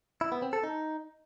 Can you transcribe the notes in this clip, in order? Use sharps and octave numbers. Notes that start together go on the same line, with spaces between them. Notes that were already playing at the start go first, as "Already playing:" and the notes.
E4
B3
C4
A4
D#4